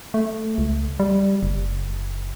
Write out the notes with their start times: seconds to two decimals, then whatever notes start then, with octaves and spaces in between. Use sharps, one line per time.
0.14 A3
0.58 C#2
1.00 G3
1.43 F#1